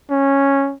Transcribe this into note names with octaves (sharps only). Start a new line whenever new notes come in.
C#4